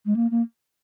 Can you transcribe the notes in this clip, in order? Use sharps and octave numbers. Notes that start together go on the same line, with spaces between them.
G#3
A#3
A#3